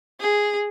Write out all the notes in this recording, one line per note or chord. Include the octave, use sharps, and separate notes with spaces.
G#4